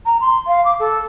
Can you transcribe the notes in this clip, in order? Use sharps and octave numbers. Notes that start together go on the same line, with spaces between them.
A#5
C6
F5
D6
A4